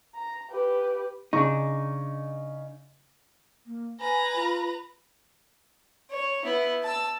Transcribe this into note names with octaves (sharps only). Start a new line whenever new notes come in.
A#5
G4 B4
C#3 D4 D#4 C#6
A#3
B4 G#5 A#5
F4
C#5
B3 E4
A5 E6